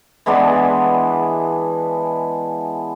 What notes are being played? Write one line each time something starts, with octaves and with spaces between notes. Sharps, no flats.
E3 G#3 B3 D4